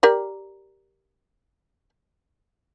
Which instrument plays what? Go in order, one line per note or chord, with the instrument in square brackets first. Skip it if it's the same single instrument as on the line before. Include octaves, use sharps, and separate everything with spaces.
[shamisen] G4 A#4 D5